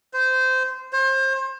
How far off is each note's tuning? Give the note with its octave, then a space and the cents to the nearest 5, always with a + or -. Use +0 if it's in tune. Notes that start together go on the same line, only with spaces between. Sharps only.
C5 -20
C5 +30